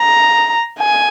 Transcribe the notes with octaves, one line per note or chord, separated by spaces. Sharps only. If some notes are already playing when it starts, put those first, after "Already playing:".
Already playing: A#5
G#5